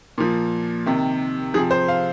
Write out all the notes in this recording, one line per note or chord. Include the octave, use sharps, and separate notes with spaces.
A#2 F3
C3 D#3
C3 F3 G#4
C5
F5